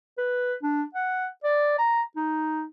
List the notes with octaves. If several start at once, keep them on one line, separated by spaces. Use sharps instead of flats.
B4
D4
F#5
D5
A#5
D#4